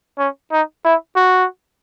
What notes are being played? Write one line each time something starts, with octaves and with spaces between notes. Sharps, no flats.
C#4
D#4
E4
F#4